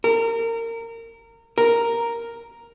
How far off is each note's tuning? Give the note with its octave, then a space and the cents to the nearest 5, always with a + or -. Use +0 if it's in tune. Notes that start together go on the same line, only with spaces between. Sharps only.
A#4 -25
A#4 +0